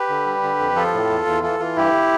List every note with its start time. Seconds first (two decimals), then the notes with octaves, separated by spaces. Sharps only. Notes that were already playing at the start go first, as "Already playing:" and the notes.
Already playing: G4 B4
0.09 D3
0.26 G3
0.43 D3
0.59 F2
0.76 F3 F4 A4
0.93 A2
1.10 E2
1.26 E2
1.43 E3 F4 A4
1.59 E3 F4
1.76 G2 E4 G4